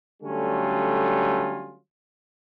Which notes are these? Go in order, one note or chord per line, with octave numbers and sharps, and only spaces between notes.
D3 F#3 G3 A3 C#4 F4